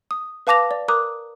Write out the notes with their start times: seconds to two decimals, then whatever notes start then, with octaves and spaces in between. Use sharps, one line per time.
0.11 D#6
0.47 B4 F5 A5 D6 A#6 F7
0.71 D5
0.88 A#4 A#5 D6 D#6 F#6